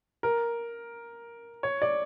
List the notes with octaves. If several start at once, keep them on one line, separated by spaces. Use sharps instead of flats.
A#4
C#5
D5